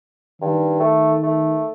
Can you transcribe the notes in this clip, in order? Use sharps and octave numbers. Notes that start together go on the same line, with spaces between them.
G2 D#3
A3
A3